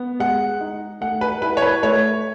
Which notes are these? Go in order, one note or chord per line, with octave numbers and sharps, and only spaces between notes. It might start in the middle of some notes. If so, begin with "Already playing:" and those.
Already playing: B3
G#3 F#5
D#4
A3 F#5
B4
E4 B4
C#5
B4
A3 C#5